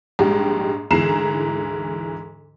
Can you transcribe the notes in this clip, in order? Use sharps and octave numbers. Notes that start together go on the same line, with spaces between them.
A#1 G#2 G3 G#3 G4
D2 G#2 E3 A#5 C7 E7